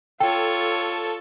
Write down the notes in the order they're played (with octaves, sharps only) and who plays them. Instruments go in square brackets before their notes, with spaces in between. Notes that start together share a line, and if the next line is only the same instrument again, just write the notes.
[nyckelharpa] F4 C#5 [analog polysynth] A4 [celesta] G5